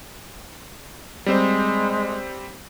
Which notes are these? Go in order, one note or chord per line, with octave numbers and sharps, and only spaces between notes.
G3 G#3 C4 C5